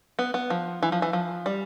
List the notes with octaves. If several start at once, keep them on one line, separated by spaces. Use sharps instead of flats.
B3
B3
F3
E3
F3
E3
F3
G3